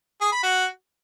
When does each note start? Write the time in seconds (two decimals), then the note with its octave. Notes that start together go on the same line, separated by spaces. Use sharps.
0.21 G#4
0.32 B5
0.43 F#4